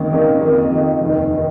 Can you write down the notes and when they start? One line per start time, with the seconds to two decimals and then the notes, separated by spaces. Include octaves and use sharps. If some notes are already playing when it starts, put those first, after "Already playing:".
Already playing: G#1 F#2 D#3 A#3
0.10 G#1 F#2 D#3 A#3
0.41 F2 D#3 A#3
0.71 F2 D#3 A#3
1.01 F1 D#2 D#3
1.33 D#3